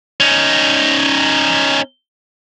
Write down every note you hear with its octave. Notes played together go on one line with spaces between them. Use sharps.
C#4 D#4